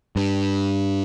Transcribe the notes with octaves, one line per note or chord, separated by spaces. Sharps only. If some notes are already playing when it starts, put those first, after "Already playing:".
G2